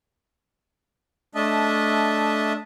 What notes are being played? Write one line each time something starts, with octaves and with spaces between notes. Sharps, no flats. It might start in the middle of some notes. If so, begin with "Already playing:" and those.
A3 D4 D#5 E5 A5